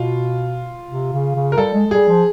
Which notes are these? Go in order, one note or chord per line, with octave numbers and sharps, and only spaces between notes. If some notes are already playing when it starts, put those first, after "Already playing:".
Already playing: B2 F4
C3
C#3
C#3
A#4
G3 A4
G#3
G#3
G3 G#4
F3